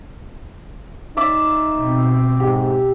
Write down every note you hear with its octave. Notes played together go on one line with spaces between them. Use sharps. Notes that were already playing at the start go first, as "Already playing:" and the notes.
D#4 D5 E5 D6
B2 C4
G#2 G4